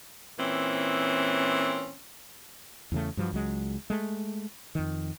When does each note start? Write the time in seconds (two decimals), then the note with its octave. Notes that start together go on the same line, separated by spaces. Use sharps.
0.38 A#2 E3 C4 C#4
2.92 E2 C#3 A3
3.17 G2 F3 F#3
3.32 C#2 F#3 G#3
3.90 G#3 A3
4.75 F2 D#3